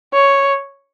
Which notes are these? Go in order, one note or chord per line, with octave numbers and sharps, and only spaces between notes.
C#5